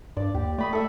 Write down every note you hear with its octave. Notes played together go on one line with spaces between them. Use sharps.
G2 D5
D#2 G4
A3 D5 B5 D#6
A4 E5